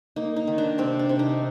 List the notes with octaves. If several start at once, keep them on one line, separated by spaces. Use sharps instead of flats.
A#3 D#4
D#4
D#3
D4
C3 C4
D4
C3
D#4